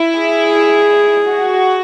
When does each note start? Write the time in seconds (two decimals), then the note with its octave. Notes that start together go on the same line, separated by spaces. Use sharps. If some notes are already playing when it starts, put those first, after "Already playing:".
Already playing: E4
0.19 G#4
1.27 F#4